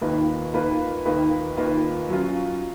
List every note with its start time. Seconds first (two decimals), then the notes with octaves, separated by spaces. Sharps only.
0.01 D#2 D#3 A#3 F4 B4
0.53 D#2 D#3 A#3 F4 B4
1.05 D#2 D#3 A#3 F4 B4
1.57 D#2 D#3 A#3 F4 B4
2.09 F#3 C#4 F4